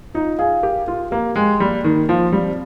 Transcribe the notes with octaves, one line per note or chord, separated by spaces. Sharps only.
D#4 F4
G#4 F5
G4 A#4
F4 G4
A#3 G4
G#3 G5
G3 A#3
D#3 A#3
F3 C5
G3 C4